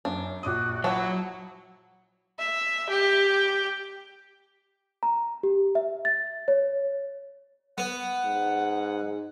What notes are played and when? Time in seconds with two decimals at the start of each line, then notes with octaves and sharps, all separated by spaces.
0.05 F#2 D4
0.43 A#1 F#4 D6 D#6
0.84 F#3 E4 C#5 F#5 A5
2.39 E5
2.89 G4
5.03 A#5
5.43 G4
5.75 E5
6.05 A6
6.48 C#5
7.78 B3 F#5
8.25 G#2